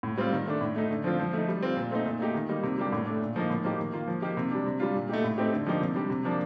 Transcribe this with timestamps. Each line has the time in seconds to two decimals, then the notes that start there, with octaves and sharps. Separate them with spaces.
0.03 A2
0.17 G3 C4 F4
0.33 D#3
0.47 A3 D4
0.61 A2
0.76 A3 D#4
0.91 D3
1.04 F3 C4 F4
1.20 F3
1.33 A3 D#4
1.48 G3
1.63 C4 F4
1.76 A#2
1.91 A3 C4 D#4
2.05 A#2
2.20 A3 D#4 G4
2.34 D#3
2.49 G3 A#3 D#4
2.63 C3
2.78 G3 A#3 D4 G4
2.92 A2
3.06 A3 D4
3.21 A#2
3.36 F3 A#3 D#4
3.50 A2
3.64 F3 A#3 D#4 G4
3.79 D#3
3.93 A#3 F4
4.08 F3
4.22 A#3 D#4 G4
4.37 C3
4.51 G3 D4
4.66 C3
4.80 G3 D4 F4
4.95 A#2
5.09 A3 D#4 G4
5.24 A2
5.38 A3 C4 D#4 G4
5.52 D3
5.66 F3 A#3 D#4 G4
5.81 C3
5.95 G3 D4 G4
6.10 C3
6.25 F3 A#3 D4